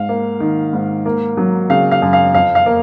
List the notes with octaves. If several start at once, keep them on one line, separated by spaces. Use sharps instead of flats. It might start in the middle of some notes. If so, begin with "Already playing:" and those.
Already playing: G#2 F5
A#3
D#3
G#2
A#3
F#3
C#3 F5
F5
F#2
F5
F2 F5
F5
A#3